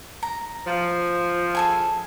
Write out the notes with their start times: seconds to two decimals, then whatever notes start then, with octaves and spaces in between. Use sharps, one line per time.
0.23 A#5
0.66 F3
1.55 G#4 A4 G#5